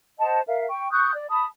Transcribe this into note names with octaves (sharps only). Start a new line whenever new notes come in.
C5 D#5 F#5 A5
A#4 E5 F5
G5 C#6
C#6 D#6 F#6 G6
D5
A5 B5 D#6